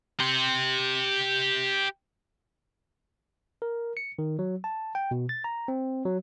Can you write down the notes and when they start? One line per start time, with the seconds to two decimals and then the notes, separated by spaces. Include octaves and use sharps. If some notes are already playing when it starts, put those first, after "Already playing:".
0.20 G4 C6
3.62 A#4
3.97 C#7
4.19 D#3
4.39 F#3
4.64 A5
4.95 G5
5.11 B2
5.29 A6
5.44 A#5
5.68 C4
6.06 F#3